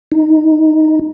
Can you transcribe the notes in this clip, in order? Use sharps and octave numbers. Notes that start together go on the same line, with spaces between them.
D#4